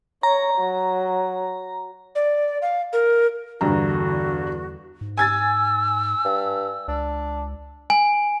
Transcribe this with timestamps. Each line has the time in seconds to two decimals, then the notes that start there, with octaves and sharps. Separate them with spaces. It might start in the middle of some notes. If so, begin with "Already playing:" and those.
0.23 C#5 A#5
0.59 F#3
2.15 D5
2.62 F5
2.93 A#4
3.61 E2 G2 D3 F#4 A#5
5.01 G#2
5.17 G#5 E6 G#6 A6
6.25 G2
6.88 C#2 D4
7.90 G#5